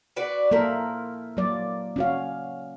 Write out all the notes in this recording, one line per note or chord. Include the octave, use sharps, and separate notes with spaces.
F#4 B4 D5
F3 A#3 E4 A4 A#4
F#3 A#3 D5
C#4 F#4 F5